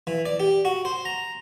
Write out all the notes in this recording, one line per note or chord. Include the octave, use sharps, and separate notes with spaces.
E3
D5
G4
F#4
C5
A#5